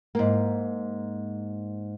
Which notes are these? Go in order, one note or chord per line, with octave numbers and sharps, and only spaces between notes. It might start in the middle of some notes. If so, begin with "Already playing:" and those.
G#2 A#3